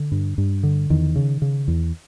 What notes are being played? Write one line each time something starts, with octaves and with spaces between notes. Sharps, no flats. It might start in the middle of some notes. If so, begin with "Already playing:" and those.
Already playing: D3
G2
G2
D3
E2 D#3
C#3
C#3
E2